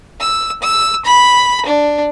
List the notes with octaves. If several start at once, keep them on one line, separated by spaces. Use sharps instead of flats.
E6
E6
B5
D4